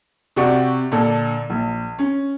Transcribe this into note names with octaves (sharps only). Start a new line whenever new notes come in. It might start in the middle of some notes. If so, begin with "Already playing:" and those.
C3 F#4 G4 D5 C#6
A#2 D3 D4 A4
A#1
C#4